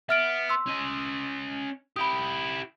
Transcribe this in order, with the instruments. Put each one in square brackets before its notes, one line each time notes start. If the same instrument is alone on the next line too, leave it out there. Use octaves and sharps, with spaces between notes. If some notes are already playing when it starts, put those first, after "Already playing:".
[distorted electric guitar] B3 [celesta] E5 F6 D7
[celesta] C6 E6
[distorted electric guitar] C#4 D#5
[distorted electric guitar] E4 G4 [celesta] B5 D#6